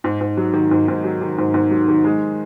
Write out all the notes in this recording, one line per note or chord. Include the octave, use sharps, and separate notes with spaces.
G#2
G#2
F#3
D#3
G#2
G#2
F#3
D#3
G#2
G#2
F#3
D#3
G#3